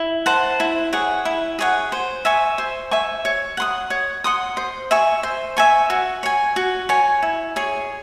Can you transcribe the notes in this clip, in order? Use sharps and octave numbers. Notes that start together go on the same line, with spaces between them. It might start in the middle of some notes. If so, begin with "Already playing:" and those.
Already playing: E4
C5 F#5 A5
E4
G#4 C#5 F#5
E4
G#4 C#5 F#5
C5
E5 G#5 C#6
C5
E5 G#5 C#6
C#5
F#5 C6 D#6
C#5
F#5 C6 D#6
C5
E5 G#5 C#6
C5
E5 G#5 C#6
F#4
C#5 G#5
F#4
C#5 G#5
E4
G#4 C#5